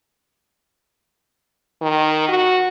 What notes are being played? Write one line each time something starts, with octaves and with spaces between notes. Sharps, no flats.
D#3
F#4